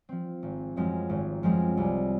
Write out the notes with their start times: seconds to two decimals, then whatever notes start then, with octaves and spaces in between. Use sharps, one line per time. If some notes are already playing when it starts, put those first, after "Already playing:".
0.09 F3 C4
0.43 G#1
0.76 F#2 F3 G#3 C4
1.09 G#1
1.43 F#2 F3 G#3 C4
1.77 C2